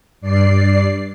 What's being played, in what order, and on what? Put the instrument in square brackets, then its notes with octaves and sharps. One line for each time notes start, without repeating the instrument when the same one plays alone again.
[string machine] G2 D5 C7